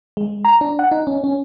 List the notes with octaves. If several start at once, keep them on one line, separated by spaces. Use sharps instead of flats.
G#3
A#5
D4
F#5
D#4
C#4
C#4